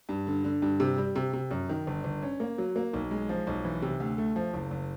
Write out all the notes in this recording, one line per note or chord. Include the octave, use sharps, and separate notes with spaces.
G2
D3
D3
G2
C3
G3
C3
C3
F#2
D#3
G1
G1
C#4
A#3
F#3
A#3
B1
G#3
F3
B1
E3
C3
D2
A3
F3
F#1
F#1